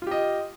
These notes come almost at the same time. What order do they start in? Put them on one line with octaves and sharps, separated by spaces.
F4 G4 D#5